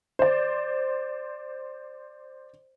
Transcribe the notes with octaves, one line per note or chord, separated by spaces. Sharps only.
C5 D5